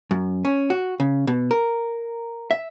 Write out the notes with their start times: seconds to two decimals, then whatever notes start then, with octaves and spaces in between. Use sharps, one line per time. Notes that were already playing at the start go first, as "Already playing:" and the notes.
0.11 F#2
0.45 C#4
0.70 F#4
1.00 C#3
1.27 B2
1.51 A#4
2.51 E5